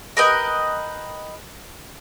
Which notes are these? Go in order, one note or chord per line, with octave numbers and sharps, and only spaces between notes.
A#4 B4 D#5 G5